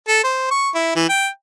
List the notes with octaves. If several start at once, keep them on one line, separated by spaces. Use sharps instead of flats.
A4
C5
C#6
E4
E3
G5